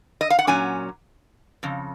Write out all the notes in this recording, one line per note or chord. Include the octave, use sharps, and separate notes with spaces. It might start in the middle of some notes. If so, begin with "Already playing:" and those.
D#5
F5
F#5
A#2 F#3 C#4 G#5
F2 C#3